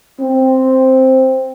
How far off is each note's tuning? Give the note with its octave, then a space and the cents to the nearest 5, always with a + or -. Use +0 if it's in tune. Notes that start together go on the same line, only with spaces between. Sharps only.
C4 +0